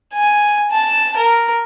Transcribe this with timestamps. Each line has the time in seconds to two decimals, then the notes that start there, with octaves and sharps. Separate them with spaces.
0.14 G#5
0.70 A5
1.16 A#4